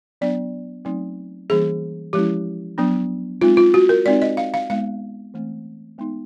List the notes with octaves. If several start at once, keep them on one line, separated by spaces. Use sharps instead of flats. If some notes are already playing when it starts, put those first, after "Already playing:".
F#3 B3 D4 D5
F#3 A3 C4 D#4
E3 G3 A#3 C#4 G#4
F3 G#3 C#4 E4 G4
F#3 B3 D4
G#3 C4 D#4 F4
F4
F#4
A#4
G#3 C4 D#4 D5
D#5
F5
F5
G#3 B3 D#4 F5
E3 A3 C4
G#3 B3 D#4